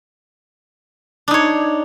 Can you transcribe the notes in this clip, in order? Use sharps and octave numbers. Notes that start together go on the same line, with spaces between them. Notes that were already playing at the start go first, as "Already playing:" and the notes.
D4 D#4 C#5